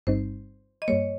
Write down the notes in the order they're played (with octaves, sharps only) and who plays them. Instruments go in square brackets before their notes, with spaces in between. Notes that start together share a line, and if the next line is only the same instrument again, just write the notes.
[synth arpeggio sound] G1 G2 G3 C4 D#4 [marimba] C5
[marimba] D#5
[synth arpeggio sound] G2 G3 A#3 [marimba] C#5